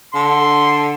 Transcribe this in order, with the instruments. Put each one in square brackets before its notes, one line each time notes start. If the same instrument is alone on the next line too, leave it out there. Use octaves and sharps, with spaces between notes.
[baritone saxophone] D3 [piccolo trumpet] C6